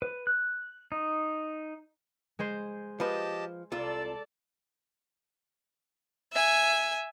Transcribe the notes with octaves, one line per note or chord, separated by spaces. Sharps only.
B4
F#6
D#4
G#3 G#4 C5
F3 G4 B4 D#5 A5
C2 F4 A4 D5 A5 E6
E5 G#5